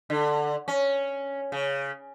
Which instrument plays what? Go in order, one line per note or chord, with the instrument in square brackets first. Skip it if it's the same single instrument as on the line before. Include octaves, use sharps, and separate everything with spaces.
[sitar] D3
C#4
C#3